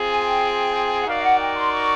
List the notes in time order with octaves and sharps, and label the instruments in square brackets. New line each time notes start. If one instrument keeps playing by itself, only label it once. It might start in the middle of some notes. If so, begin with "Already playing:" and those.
Already playing: [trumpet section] C4 F4 G#4
[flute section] G#5
G5
F#5
[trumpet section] D#4 F#4 A#4 D5 [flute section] F5
[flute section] F#5
G5
C6
C#6